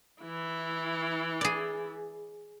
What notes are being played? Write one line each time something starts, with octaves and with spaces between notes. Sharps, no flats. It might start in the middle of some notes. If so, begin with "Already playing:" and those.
E3 E4
G#4 D5